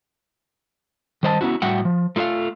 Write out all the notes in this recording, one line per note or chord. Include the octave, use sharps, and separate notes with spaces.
D#3 G3 C5 D#5 F5 A5
B3 C#4 E4 F#4
A2 G3 F#4 E5 F#5 G5
F3
A3 F4 A4 E5 F5